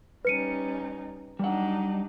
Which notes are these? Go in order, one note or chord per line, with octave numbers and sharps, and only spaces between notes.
G3 C#4 D#4 B4 C#7 D#7
F#3 G3 D4 D#4 F#5